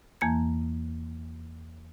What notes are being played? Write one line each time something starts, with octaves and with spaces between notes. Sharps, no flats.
E2 E3 A#3 A5 A#5 G#6